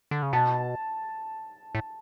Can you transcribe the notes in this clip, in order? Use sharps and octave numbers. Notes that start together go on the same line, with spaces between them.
D3
C#3
B2 A5
A2